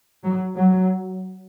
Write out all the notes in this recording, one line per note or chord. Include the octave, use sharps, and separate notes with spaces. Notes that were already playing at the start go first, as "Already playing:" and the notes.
F#3
F#3